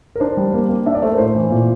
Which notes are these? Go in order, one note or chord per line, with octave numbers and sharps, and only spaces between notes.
A#4
D4 C5
G3
A#3
A#3
D4 E5
D5
A3 C5
A#4
A2 C5
E3
A#2